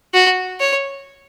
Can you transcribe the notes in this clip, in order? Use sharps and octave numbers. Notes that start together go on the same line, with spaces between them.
F#4
C#5